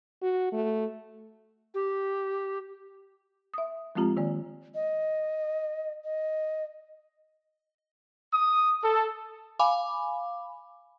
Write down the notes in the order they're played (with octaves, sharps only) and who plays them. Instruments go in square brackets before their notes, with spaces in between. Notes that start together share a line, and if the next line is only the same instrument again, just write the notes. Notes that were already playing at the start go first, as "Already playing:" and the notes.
[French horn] F#4
A3
[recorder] G4
[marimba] E5 D#6
F3 G#3 C4 F4 G4 A#5
D#3 A#3 D5
[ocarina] D#5
D#5
[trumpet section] D#6
A4
[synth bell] F5 G#5 B5 D6